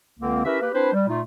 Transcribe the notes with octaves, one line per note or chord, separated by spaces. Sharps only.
C#2 D3 A#3 C4
C#4 E4 G4 A#4 B4 E5
A#3 G4 B4
C4 D4 E4 B4 C5
G3
A#2 A3 D#4 F4